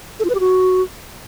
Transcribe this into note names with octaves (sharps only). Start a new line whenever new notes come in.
A4
F4
B4
G4
F#4